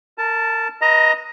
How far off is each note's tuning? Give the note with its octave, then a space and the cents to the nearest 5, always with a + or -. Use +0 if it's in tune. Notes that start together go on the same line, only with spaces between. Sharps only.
A#4 -30 A5 +0
B4 -25 D#5 +15 A#5 -15